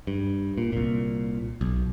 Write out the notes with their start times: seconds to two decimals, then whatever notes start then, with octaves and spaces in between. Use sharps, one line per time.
0.07 G2
0.58 A#2
0.72 C2 A#2
1.61 B1